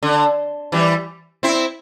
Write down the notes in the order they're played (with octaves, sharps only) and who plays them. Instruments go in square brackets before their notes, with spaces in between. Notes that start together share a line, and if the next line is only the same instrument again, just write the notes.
[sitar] D3
E3 G3
C4 E4